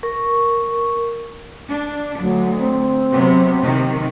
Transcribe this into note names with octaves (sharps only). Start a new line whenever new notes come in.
A#4 C#6
D4
D2 F#3
C4
C3 F#3 B3
C3 D#3